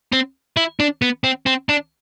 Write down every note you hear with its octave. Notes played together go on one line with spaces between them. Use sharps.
C4
E4
D4
B3
C4
C4
D4